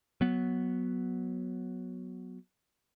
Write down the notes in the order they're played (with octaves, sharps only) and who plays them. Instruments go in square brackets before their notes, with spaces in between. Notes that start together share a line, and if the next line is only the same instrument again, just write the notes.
[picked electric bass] F#3 B3